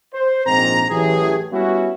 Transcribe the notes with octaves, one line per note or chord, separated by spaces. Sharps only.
C5
A#1 G#2 C4 A#5
A1 E3 F#3 A3 G4 G#4
G3 B3 C#4 E4 F#4